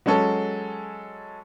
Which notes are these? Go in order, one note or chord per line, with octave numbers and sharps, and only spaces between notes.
F#3 G#3 C#4 A4